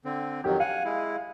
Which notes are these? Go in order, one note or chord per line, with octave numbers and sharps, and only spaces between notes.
D3 C4
F2 D#3 F#3 G4
F5 F#5 G#5
G#3 E4